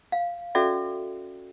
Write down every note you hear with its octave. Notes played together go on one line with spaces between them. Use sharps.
F5
C#4 F#4 A4 D5 E5